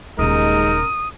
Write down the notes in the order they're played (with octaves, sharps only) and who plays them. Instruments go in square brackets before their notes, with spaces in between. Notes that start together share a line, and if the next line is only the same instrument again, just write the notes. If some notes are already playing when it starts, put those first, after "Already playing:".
[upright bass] D#1 C#3 [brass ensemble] D#2 G#3 D#4 [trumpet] A#4 [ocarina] D#6